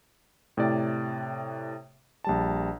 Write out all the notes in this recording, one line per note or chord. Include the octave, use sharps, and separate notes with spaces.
A2 C3 D5
A#1 G3 A5